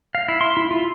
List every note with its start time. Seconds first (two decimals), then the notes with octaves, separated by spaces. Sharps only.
0.15 F5
0.28 E4
0.41 C6
0.57 E4
0.71 F4